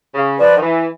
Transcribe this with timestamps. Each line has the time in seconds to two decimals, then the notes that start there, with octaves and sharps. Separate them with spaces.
0.15 C#3
0.38 F3 B4 D5
0.55 D#3
0.62 E3